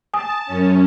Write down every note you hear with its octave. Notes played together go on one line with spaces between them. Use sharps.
G#5 A5 D#6
F#2 C#4